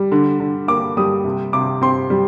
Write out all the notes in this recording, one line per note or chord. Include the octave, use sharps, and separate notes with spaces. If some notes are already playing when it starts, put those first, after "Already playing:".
Already playing: G3
D3
D3
A#3 D6
G3 D#6
C3
C3 D6
C4 C6
G3